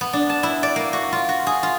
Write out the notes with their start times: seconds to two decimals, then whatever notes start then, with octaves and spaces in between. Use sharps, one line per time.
0.01 B3
0.13 D4
0.30 A5
0.43 E4
0.63 D5
0.76 A#3
0.93 F#4
1.12 F4
1.29 F#4
1.47 G#4
1.63 F4